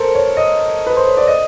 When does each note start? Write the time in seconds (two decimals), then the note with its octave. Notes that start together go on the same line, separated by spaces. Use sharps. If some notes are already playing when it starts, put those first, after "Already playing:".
Already playing: A4 A#4 C5
0.15 C#5
0.37 D#5
0.87 B4
0.97 C5
1.06 C#5
1.17 D5
1.27 D#5